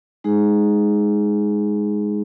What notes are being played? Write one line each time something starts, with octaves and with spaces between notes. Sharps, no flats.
G#3 D#4 G#4